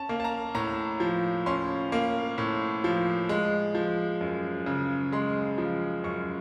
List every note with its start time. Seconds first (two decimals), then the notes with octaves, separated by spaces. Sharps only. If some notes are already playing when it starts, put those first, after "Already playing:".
Already playing: C#4 A5
0.09 A#3
0.20 A5
0.24 A#5
0.55 A2 A#5
1.00 F3
1.46 C#4 C6
1.92 A#3
2.38 A2
2.84 F3
3.29 G#3
3.75 F3
4.21 F#2
4.66 C#3
5.12 G#3 C6
5.58 F3
6.04 F#2 C#6